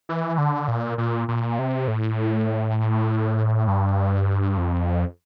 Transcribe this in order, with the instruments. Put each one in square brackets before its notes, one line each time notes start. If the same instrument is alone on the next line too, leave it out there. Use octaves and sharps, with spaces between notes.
[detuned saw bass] E3
D3
A#2
A#2
A#2
C3
A2
G2
F2